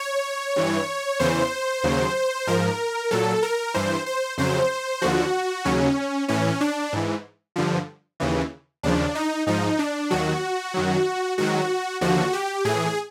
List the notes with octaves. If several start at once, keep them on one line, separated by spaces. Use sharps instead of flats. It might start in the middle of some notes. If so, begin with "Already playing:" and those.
Already playing: C#5
G2 E3
E2 C#3 E3 C5
D#2 C#3 F#3
G#2 F3 A#4
A#2 F#3 A4
A#4
G2 E3 C5
C5
F2 C#3 F#3 C5
D#2 D3 F3 F#4
D#2 C#3 F#3 C#4
A2 E3 C#4
D4
G#2 E3
G2 D3 F3
D#2 C#3 E3
D#2 C#3 F3 D4
D#4
G#2 F3 D#4
D4
D#2 D#3 F#3 F#4
F#2 D#3 F#3
G#2 D#3 F#3 F#4
D#2 D3 F3 F#4
G4
A2 E3 G#4